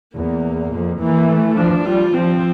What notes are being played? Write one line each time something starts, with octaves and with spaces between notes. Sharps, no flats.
E2 A#3
F2
E3 A#3
A3
F3 D4
G3 F4
F3 C4